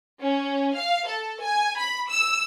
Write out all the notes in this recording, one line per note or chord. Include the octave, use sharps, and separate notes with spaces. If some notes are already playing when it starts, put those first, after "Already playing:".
C#4
F5
A4
G#5
B5
E6